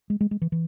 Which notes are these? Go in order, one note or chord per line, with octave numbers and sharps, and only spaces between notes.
G#3
G#3
G#3
E3
E3